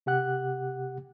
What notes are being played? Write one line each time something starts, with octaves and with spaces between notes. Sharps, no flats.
C3 G4 F#5 F#6